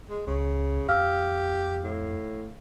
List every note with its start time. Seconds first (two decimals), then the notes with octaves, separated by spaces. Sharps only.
0.09 G#3
0.27 C#2 C#3
0.88 F2 G4 F5 E6 F6
1.84 A2